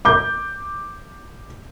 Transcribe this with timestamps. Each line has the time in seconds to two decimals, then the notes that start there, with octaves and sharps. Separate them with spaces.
0.05 D6 G6